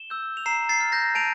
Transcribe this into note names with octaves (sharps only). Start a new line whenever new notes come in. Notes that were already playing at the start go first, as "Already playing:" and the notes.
Already playing: E7 G7
E6 G6
F7
A#5 C7 E7
A6 C7
F6
G6 A#6
A5 D7 F7